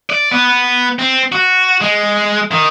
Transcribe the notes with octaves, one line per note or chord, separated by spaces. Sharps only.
D5
B3
C4
F#4
G#3
D#3